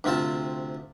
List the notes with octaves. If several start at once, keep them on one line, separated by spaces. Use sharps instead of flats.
D2 C3 C4 F4 A5